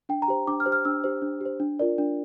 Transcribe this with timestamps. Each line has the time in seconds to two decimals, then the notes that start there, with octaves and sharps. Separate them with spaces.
0.09 D4 G5
0.22 A#5
0.28 G4 C5
0.47 D4 D6
0.60 F6
0.66 G4 C5
0.72 F6
0.85 D4 E6
1.04 G4 C5
1.22 D4
1.41 G4 C5
1.60 D4
1.79 F4 A#4 D5
1.98 D4